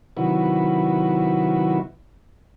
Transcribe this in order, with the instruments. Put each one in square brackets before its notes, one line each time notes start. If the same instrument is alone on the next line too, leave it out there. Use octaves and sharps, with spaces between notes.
[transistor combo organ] C3 D#3 F#3 E4 F#4 B4